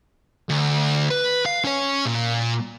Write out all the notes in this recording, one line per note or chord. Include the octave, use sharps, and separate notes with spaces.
D2
B4
F5
C#4 C#5
A#2